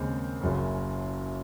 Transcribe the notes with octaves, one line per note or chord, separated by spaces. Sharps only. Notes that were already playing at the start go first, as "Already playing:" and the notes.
Already playing: D#2 C#3 G#3 C4
F#1 F#2 C#3